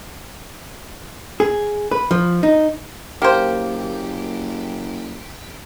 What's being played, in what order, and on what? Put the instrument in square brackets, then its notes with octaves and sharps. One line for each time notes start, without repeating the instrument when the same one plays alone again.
[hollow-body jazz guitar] G#4
B4
F3
D#4
[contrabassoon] F#1 [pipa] A#3 C5 [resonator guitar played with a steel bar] G4